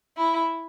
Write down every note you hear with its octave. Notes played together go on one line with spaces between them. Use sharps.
E4